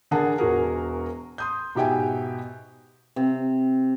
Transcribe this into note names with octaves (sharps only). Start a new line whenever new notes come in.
D3 G#4 A#4 F#5 A5
E1 F#4 G#4 A#4
C6 D#6 G6
G#2 B2 G4 E5 G5 G#5
C3